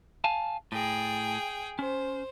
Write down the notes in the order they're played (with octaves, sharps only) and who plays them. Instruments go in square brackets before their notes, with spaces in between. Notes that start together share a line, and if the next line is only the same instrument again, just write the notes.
[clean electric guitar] F5 G#5 A5
[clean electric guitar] A2 [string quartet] G#4 G5
[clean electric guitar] C#4 [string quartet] C5